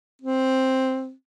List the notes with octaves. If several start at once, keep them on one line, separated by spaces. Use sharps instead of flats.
C4